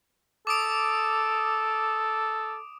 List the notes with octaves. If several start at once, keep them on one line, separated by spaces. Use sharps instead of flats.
A4 D6 D#6 D7